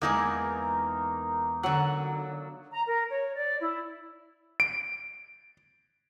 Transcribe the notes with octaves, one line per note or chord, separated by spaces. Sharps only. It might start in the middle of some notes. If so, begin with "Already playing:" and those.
E2 E3 G#3 A#3 D#4 A#4
D3 F#3 F#5
A#5
A#4
C#5
D5
E4
D7